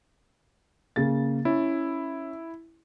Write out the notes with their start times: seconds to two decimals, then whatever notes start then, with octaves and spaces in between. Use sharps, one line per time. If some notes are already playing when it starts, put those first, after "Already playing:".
0.96 C#3 A#3 A6
1.45 C#4 E4